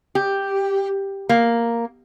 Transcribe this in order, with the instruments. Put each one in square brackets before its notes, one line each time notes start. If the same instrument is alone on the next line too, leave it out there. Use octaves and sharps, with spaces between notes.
[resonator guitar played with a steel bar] G4
A#3